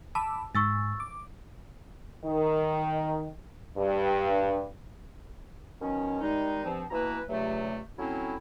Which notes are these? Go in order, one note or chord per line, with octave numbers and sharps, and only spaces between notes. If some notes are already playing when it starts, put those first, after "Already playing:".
A5 B5 D6 E6
G#2 C#6 E6 A6
D6
D#3
G2
B2 D#3 F#3 C#4
D#3 G3 G#3 D#4
G2 F3 C4
B2 E3 A#3 E4 B4 A#5
C#2 G2 C3 F#3 A3
F#3 A3 C4 C#4 E4